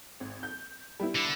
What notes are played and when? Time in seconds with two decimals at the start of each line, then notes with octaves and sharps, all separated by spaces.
0.20 G#1
0.43 G6
1.00 G3 B3 E4
1.16 D3